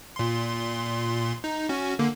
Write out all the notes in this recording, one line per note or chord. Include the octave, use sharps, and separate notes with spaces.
A#2 C6
D#4
C#4 F#4
D3 A#3